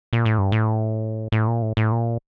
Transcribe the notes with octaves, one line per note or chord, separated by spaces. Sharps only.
A#2
A2
G2
A2
A2
A#2
A2
A2
A#2